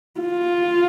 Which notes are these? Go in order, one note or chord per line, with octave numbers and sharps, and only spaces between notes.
F4